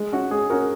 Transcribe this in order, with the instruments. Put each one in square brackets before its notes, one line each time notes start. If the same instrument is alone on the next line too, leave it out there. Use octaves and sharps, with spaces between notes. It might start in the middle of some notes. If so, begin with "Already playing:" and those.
Already playing: [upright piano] G#3
C#4 F#4
[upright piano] G#3 [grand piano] G#4
[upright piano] C#4 F#4 [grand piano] A#4